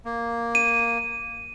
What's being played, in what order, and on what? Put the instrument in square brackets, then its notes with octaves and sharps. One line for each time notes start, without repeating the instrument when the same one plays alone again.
[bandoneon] A#3
[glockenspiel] D#7